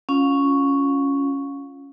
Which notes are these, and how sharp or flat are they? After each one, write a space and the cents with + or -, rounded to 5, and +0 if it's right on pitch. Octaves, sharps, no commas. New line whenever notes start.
C#4 +0 F4 -10 F5 +35